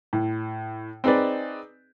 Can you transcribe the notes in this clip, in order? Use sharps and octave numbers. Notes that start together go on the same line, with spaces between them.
A2
C4 D#4 G#4 B4 D5